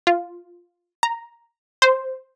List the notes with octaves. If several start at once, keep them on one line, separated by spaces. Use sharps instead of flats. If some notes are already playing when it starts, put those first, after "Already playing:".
F4
A#5
C5